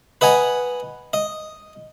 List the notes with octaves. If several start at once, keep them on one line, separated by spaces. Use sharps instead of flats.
B4 D#5 F#5 G#5 A#5
D#5